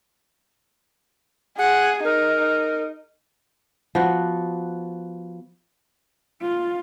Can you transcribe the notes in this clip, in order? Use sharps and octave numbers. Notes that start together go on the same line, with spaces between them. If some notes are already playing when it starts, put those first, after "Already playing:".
G#4 F#5
D#4 A#4
F3 B3 F#4
F4